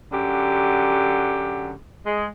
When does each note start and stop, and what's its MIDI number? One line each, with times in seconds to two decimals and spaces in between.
0.13 1.73 42
0.13 1.73 50
0.13 1.73 67
2.06 2.27 56